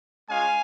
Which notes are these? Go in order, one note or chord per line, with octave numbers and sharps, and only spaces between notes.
G#3 C#4 F4 F5 G#5